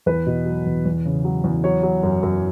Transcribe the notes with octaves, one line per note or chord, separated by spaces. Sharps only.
E2 B4
B2
F#3
E2
E2
C#3
F#3
E2
F#3 C#5
F#3
F#2
F#2